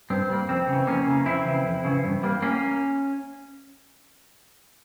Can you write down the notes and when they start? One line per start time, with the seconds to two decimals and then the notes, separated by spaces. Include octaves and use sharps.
0.10 G2 C4
0.30 G3 A#3
0.49 F2 C4
0.67 C#3
0.73 E3
0.87 F2 A#3 C#4
1.07 C#3 E3
1.26 F2 C4 E4
1.45 C#3 E3
1.65 F2
1.84 C#3 E3
2.04 G2
2.23 G3 A#3
2.42 A#3 C#4